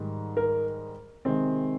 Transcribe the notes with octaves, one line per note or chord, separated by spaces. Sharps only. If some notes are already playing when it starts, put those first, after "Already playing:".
Already playing: G#2 D#3 G3
A#4
C3 D#3 G#3 C4